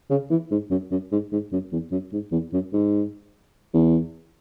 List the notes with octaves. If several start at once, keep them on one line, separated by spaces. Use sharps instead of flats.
C#3
E3
G#2
F#2
F#2
G#2
G#2
F#2
E2
F#2
G#2
E2
F#2
G#2
E2